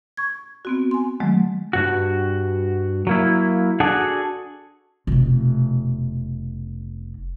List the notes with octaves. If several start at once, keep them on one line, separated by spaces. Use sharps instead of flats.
C#6 G#6
B3 C4 F#4
G#5 C6
D#3 F#3 G#3 A3
G2 A#2 F#4
F#3 A#3 E4
D4 F#4 G#4 A4 F#5
F1 B2